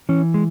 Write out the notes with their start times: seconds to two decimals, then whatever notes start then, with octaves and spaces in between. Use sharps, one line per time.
0.09 E3 C#4
0.34 G#3